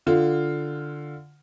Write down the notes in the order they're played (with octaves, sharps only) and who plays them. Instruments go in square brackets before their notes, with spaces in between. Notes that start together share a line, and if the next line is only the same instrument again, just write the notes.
[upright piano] D3 F4